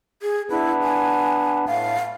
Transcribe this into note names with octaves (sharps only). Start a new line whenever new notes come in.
G#4
B3 D4 E4 B4
G#5
A2 A3 F5